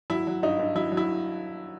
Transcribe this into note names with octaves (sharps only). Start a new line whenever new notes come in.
F#3 E4
F#3
G2 D#4
G2
F#3 E4
F#3
E4